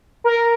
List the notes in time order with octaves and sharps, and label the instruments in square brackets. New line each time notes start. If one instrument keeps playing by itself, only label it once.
[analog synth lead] A#4